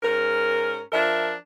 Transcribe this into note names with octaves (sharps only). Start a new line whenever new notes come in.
G#2 C#4 A#4
F3 D4 A#4 E5